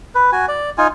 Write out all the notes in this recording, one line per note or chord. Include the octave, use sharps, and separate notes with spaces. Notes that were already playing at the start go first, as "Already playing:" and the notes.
B4
F#4 G#5
D5
D#4 F4 G#5